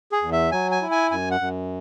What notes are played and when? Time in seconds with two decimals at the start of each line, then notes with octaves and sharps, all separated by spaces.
0.12 G#4
0.22 E2
0.32 E5
0.52 F#3 G#5
0.72 G#5
0.82 E4
0.91 G#5
1.11 F#2 G#5
1.31 F#5
1.40 F#2